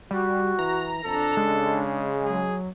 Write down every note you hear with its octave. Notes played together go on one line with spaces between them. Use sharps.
G3 F#4
E3 A#5
F2 D4 A4
C#3 G#3
F#3 G#4